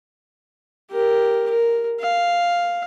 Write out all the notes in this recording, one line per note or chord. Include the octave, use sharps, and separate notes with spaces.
G4 A#4
A#4
F5